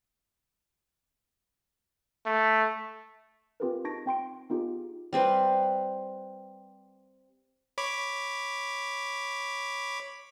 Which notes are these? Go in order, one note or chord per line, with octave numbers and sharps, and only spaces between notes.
A3
C4 F4 G4 G#4 A#4 B4
D#4 A5 C#6 G#6 A#6 D7
C4 G5 C6 D7
B3 D#4 F4 G4 G#4
G3 C4 B4
C#5 B5 D6